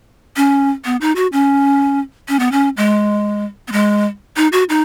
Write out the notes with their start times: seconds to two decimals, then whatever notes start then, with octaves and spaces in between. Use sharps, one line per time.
0.36 C#4
0.85 B3
1.01 D#4
1.16 F#4
1.33 C#4
2.28 C#4
2.40 B3
2.52 C#4
2.77 G#3
3.68 B3
3.72 G#3
4.37 D#4
4.52 F#4
4.69 D#4